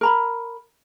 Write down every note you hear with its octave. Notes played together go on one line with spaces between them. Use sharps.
A#4 A#5 B5